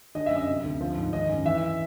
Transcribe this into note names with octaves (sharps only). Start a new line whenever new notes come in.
D3 D#5
F#2 E5
D#5
C3
D2
F3
G#2
D#3 D#5
F#2
E3 E5